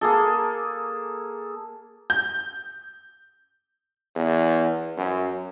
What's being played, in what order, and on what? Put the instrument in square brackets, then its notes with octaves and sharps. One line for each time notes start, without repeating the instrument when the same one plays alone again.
[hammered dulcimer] A#3 G#4 A4
[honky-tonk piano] G6
[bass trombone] E2
F#2